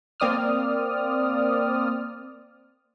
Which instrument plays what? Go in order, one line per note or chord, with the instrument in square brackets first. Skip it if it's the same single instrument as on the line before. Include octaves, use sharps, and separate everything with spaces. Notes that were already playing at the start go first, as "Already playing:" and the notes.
[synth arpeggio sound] A#3 C4 D5 D#6 F6